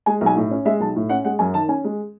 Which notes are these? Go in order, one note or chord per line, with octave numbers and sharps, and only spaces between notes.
G#3 G#5
B1
G#5
A2
C#4
G#3 E5
B1 A5
A2
C#4 F#5
G#3 F#5
F#2 G#5
D#3 A5
C#4 G#5
G#3